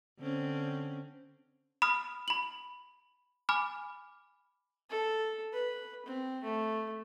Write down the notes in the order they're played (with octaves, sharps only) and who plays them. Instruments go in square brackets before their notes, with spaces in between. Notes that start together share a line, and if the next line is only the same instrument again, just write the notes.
[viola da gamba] D3 C4 C#4
[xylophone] B5 D#6 F6
B5 F#7
G#5 B5 D6 F6
[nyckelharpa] A4
B4
C4
A3